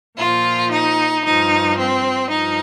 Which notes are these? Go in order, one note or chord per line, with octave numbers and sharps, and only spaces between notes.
A#2 F3 F4
D#4
G2 F3 D#4
C4
G2 F3 D#4